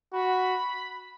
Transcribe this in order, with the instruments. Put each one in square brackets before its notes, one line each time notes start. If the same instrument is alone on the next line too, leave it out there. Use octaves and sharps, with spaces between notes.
[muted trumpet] F#4 [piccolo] B5